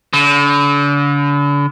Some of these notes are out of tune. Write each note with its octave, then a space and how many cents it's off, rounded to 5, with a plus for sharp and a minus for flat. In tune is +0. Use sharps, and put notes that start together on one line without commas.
D3 -40